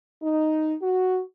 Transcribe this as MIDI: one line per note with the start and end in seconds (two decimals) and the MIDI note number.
0.21 0.74 63
0.81 1.20 66